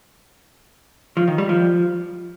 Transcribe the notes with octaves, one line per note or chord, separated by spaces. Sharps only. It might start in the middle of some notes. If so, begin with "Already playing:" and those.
F3
D#3
G3
F3